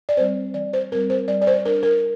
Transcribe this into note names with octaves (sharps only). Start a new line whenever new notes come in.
D5
G3 C4 C5
E3 D5
C5
G3 C4 A#4
C5
G3 D5
D5
C5
D4 A#4
A#4